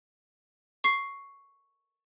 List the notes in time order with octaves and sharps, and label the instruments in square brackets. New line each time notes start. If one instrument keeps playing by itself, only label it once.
[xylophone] C#6 C7